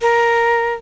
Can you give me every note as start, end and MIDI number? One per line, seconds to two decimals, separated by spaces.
0.02 0.74 70